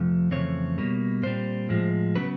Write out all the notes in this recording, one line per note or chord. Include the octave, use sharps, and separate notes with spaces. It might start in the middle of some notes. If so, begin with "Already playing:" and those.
Already playing: F2 C3 F3 A3
F2 C#3 E3 A3 C4 C#5
B2 G3 A#3
A#2 G3 C4 C5
A2 F3 G#3
C#3 F#3 B3 B4